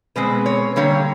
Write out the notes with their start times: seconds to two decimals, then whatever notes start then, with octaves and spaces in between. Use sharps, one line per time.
0.16 B2 G#3 C4 B4
0.46 C#5
0.76 D3 G3 A#3 C#5